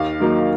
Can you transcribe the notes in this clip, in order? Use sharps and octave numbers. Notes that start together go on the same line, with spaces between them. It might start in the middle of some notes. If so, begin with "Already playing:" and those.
Already playing: D#2 F5
D#3 F#3 A#3 D#4